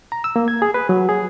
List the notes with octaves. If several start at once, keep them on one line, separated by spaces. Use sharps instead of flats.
A#5
E6
A#3
G#6
G#4
B4
F#3
G#4